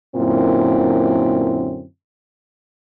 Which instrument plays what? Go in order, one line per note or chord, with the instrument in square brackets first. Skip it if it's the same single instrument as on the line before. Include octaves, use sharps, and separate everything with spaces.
[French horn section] F#2 A#2 D3 C4 E4